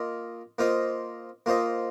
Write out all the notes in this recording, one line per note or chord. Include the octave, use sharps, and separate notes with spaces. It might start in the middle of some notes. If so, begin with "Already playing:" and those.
Already playing: A#3 F4 D#5
A#3 F4 C5 D#5
A#3 F4 C5 D#5